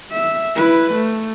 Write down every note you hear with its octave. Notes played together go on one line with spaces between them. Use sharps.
E5
E4 B4
A3